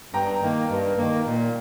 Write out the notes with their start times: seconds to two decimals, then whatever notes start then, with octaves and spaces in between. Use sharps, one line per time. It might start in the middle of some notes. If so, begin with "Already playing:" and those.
0.13 G2 G5 A#5
0.41 D#3 A#3
0.70 G2
0.97 D#3 A#3
1.26 A#2